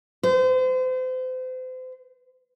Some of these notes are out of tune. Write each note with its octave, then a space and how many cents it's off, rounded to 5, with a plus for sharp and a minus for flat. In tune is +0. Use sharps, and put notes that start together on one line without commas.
C5 -35